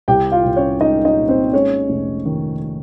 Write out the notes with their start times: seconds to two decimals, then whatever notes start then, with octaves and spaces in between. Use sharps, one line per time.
0.08 C2 G4 G5
0.32 F4 F5
0.44 C2
0.56 C#4 C#5
0.81 G#3 D#4 D#5
1.05 D#4 D#5
1.17 A#2
1.28 C4 C5
1.53 G#3 C#4 C#5
1.89 F1
2.25 D#3